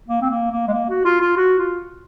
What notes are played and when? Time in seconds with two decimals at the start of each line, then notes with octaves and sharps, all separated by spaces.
0.09 A#3
0.22 C4
0.30 A#3
0.52 A#3
0.68 G#3
0.73 A#3
0.90 F#4
1.05 F4
1.21 F4
1.37 F#4
1.59 F4